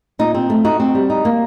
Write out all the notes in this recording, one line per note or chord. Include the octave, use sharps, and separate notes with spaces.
A#2 D#4
C4
A3
D#4 F#4
C4
G3
D#4
A#3